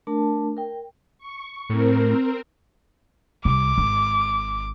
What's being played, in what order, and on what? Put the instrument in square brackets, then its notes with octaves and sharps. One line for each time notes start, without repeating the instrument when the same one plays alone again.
[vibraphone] A3 D4 A#4 A5
A#4 G5
[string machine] C#6
[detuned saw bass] A2 [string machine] C4 A#4
[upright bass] C2 [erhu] D6
[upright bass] G#1